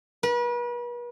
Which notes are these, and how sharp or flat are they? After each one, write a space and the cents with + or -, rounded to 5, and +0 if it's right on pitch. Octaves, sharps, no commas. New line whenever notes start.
B4 -40